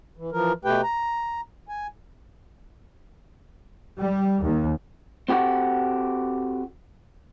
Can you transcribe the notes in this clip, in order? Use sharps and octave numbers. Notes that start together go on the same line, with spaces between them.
E3
E3 F3 A#4
B2 A3 G4 B4 G5
A#5
G#5
G3
D#2
C4 F#4 G4 A4 F#5